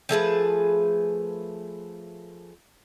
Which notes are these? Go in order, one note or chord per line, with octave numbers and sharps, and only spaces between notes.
F3 A3 G#4 B4